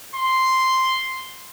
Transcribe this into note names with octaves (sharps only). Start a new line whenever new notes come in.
C6